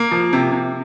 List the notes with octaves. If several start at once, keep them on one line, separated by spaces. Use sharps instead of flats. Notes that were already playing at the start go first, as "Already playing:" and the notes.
Already playing: A#3
F3
C3
C3